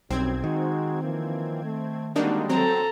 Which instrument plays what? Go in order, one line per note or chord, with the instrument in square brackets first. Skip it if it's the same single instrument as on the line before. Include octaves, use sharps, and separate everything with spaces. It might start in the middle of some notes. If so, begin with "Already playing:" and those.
[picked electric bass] B1 [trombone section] F#2 G3 [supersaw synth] C4 G#6
[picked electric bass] D#3 [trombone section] G#3 D#4 F#4
[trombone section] E3 F3 A#3
A3
[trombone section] D3 G3 G#3 [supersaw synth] A#3 D4 D#4 [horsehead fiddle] C4 F#4
[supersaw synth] F#3 C4 [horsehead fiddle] A4 A#5